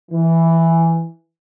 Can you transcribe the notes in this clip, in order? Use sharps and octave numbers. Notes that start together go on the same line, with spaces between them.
E3